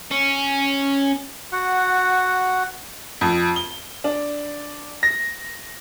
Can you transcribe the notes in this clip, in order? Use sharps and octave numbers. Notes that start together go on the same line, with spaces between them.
C#4
F#4 F#5
F2
G7
D4
A#6